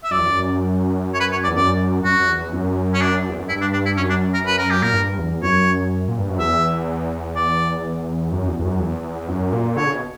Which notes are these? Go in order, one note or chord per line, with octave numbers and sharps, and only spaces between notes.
E5
F#2 D5
E2
F#2
C#5
B4
C#5
D5
E2
F#2 D5
F#2 F#4
F#2
E2
F#2
C#4
D4
E2
F#2
G2 E4
D4
D4
E4
F#2 C#4
D4
A#4
B4
A#4
G4
A#2 A#4
G2
E2
F#2 C#5
A#2
G2
F#2
E2 E5
D5
F#2
E2
E2
F#2
E2
F#2
A#2
D3 C#5
C#3
B2